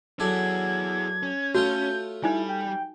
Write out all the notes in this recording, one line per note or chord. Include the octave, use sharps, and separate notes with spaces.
F#3 E4 G#4 A4 D5 G#6
C#4
A3 F4 F#4 C#5 G6
G3 D#4 E4 G#5
G5